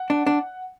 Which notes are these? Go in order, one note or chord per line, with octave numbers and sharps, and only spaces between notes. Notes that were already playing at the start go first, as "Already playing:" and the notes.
Already playing: F#5
D4
D4